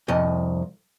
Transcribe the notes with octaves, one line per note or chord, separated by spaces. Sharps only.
C2 F2 D#5